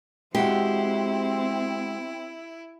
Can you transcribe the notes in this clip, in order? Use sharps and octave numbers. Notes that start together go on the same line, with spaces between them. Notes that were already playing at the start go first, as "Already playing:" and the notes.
G#3 C4 E4 F#4 G4